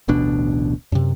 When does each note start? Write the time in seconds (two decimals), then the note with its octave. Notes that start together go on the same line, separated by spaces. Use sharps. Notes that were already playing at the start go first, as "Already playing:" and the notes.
0.08 D1 A1 B2 D4
0.92 F#2 C3